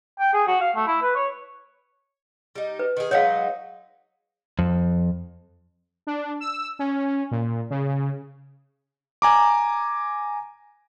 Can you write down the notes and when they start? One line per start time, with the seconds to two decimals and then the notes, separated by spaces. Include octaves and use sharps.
0.20 G5
0.33 G#4
0.47 F#4
0.61 F5
0.76 A3
0.87 E4
1.02 B4
1.15 C#5
2.55 G3 D#4
2.79 B4
2.97 D#3 G#4
3.11 F#3 G#3 D#4 C#5 F5
4.59 F2
6.07 D4
6.40 E6
6.79 C#4
7.31 A#2
7.70 C#3
9.22 G#5 A#5 D6